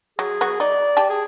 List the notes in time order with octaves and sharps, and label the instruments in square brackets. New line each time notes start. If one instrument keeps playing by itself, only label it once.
[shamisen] F#3 [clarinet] G#4
[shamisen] F#3 B3 F#4
[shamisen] D#4 [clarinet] D5
[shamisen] G4 G5 A5
[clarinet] G#4